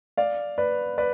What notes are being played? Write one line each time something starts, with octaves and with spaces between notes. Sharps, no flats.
D5 F5
B4 D5
B4 D5